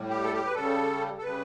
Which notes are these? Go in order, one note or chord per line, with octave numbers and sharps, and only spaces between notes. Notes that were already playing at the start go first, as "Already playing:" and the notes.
Already playing: A2 G3
G4
A4
G4
B4
C#3 G3 A4
A4
C#3 G3 B4